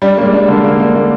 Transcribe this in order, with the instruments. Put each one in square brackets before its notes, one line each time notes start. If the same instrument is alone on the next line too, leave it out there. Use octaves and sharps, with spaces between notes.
[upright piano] G3 [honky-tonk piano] D4
[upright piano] G3 [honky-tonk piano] A#3
[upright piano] G#3
[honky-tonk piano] D4
[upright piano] D3 [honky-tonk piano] A#3
[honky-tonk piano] A#3
A#3
A#3